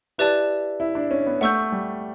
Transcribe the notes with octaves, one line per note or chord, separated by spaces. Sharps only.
E4 G4 B4 D5 A5
E4
D4
C#4
B3
A3 F#5 C#6 E6 G6
G3